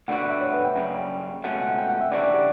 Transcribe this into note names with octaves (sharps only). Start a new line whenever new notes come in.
D2 D3 G3 B3 F#4 F#5
F#5
E5
C#5
B4
G5
F#2 C#3 G3
C#2 B2 A3 C#4 F#5
F#5
G5
F#5
E5
C#3 E3 G3 D4 F#4 D5
D5
G4